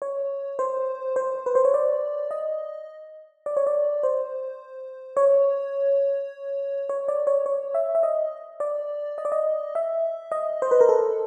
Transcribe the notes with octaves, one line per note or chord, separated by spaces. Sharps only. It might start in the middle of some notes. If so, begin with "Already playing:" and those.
C#5
C5
C5
B4
C5
C#5
D5
D#5
D5
C#5
D5
C5
C#5
C#5
D5
C#5
C#5
E5
E5
D#5
D5
D#5
D5
D#5
E5
D#5
C5
B4
A#4
A4